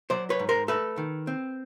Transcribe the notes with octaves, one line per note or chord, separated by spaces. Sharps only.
F#3 C5 D5
B4 C#5
G#2
A#4 C5
A3 A4 B4
D#3
C4